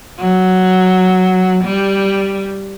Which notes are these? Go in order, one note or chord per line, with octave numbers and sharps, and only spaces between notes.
F#3
G3